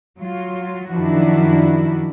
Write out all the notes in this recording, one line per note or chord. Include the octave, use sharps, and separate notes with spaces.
F#3 F4
F#2 D#3 F3 D4 E4 F#4